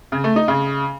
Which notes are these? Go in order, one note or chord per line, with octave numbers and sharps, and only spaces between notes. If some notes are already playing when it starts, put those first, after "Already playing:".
C#3
A3
D#4
C#3